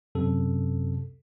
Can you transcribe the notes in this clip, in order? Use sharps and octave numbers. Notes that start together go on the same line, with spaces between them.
F#2 C3 A4